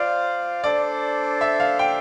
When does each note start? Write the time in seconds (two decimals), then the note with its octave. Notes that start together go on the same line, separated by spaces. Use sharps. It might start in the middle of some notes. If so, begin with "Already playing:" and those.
Already playing: F4 C5 D5 F5
0.64 D4 A4 C5 D5
1.41 E5
1.60 F5
1.79 G5